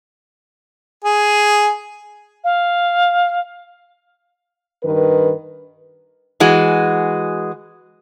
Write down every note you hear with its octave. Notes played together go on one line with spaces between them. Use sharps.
G#4
F5
G2 D#3 A#4 B4
E3 G#3 F#4